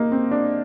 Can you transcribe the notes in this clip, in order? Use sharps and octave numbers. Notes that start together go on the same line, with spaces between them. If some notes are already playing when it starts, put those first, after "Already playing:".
Already playing: A#3 D#4
C4
D4